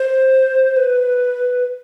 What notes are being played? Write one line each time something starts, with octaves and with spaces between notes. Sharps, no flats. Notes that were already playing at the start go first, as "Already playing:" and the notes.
Already playing: C5
B4